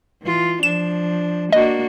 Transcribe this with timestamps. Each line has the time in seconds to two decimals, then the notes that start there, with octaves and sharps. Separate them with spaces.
0.22 E3 F4
0.63 F3 D4 E7
1.52 A#3 D4 F#4 D#5